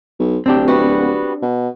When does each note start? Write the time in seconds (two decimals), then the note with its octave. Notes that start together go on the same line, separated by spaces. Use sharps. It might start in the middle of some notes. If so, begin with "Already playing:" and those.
0.20 B1
0.46 D1 C4 D4 G4
0.68 G3 B3 F#4
1.42 B2